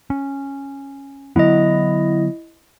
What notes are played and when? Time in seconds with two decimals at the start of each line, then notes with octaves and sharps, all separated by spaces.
0.10 C#4
1.36 D3 F#3 B3 E4 D#5